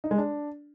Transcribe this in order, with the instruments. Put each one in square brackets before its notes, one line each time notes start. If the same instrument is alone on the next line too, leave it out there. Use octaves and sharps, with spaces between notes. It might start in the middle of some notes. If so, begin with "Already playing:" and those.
[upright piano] D#4
G#3
D4